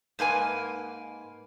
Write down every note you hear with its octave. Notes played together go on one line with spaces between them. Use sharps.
G#2 A#3 B4 G#5